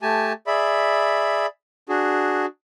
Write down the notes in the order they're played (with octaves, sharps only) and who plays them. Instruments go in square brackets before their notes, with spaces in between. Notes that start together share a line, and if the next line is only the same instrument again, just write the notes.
[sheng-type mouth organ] A3 G4 G#5 A5
G#4 D5 E5 B5
D4 F#4 G#4